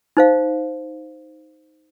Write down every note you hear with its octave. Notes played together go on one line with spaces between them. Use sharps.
D#4 C5 F5